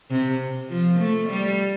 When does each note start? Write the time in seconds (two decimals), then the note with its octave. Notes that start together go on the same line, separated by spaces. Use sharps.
0.11 C3
0.69 F3
0.99 A3
1.29 G3